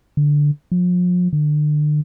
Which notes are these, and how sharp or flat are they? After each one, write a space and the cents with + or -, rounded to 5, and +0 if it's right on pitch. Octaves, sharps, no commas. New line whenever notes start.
D3 -5
F3 +40
D3 +30